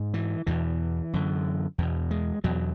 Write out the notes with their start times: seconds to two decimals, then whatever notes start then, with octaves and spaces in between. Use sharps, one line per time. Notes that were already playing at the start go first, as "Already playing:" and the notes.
Already playing: G#2
0.14 E3
0.47 E2 B2 E3
1.13 F#2 D3
1.78 E2 B2
2.11 G#3
2.44 E2 B2 F#3